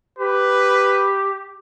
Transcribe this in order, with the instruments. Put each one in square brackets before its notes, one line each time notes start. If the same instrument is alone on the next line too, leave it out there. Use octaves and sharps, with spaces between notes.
[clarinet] G4 [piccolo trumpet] B4